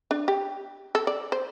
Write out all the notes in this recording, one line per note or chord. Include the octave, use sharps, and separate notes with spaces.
D4
G4
A4
D5
C5